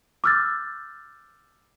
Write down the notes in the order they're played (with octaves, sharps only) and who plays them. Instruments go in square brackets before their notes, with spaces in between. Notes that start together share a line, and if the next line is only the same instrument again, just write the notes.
[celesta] D6 E6 F6 G6 A6